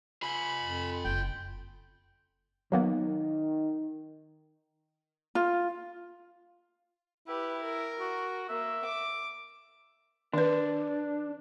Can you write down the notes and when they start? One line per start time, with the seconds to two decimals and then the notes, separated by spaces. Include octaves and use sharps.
0.22 F4 G#5 B5
0.62 F2
1.05 F#1 G5
2.72 D#3 F#3 A#3 B3
5.35 F4
7.28 E4 G4 B4
7.63 A#4
8.00 F#4
8.49 A#3 E5
8.85 D6
10.33 D#3 D4 B4